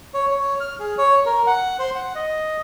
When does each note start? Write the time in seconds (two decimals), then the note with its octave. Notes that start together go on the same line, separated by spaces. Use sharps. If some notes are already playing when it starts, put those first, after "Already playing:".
0.14 C#5
0.31 C#5
0.60 F6
0.80 G#4
0.98 C#5
1.26 A#4
1.47 F#5
1.79 C5
1.95 F#5
2.15 D#5